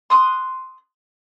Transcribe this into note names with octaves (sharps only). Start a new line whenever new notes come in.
C6 D#6 F#6